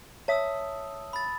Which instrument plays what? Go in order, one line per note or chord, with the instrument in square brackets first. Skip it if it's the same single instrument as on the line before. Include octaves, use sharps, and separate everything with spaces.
[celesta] C#5 E5 B6 [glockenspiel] A5 D#6 E6
[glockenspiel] B5 A6